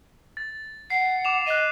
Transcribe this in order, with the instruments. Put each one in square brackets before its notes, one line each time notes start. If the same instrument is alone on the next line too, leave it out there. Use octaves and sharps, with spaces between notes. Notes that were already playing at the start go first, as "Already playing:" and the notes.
[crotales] A6
[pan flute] F#5 [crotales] C7
[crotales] D6 E7 F7
[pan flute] D#5 [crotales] F#6 D#7